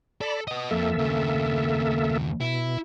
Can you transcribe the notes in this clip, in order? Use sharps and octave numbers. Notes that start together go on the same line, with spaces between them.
A4 D5 B5
B4 D#5 D#6
F2 A#3 A4 E5
D#2 C#3
B2 E4